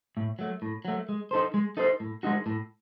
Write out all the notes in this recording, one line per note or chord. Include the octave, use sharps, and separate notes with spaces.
A2
F#3 A3
A2
F#3 A3
G#3
D#4 A4 C5
G#3
D#4 A4 C5
A2
G#3 D#4 F#4
A2